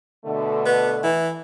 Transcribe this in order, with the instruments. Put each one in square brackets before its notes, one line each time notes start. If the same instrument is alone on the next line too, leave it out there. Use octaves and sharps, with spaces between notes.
[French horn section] B2 D3 A3
[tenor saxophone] B3
E3